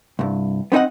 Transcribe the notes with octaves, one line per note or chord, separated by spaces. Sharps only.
C2 G2
B3 C4 D#4 D#5 F#5